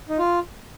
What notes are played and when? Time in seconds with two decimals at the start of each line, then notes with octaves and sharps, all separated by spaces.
0.09 D#4
0.18 F4